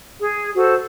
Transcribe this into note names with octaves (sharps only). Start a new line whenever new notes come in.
G#4
F#4 A4 C5